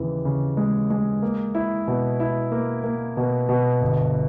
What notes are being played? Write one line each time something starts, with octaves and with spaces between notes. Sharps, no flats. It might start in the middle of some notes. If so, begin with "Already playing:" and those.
Already playing: D#2 C#3 E3
C#3
G#3
G#3
A#3
E4
B2
E4
A#3
A#3
B2
B2
G1